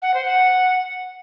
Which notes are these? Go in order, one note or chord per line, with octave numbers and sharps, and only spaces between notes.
F#5
C5
F#5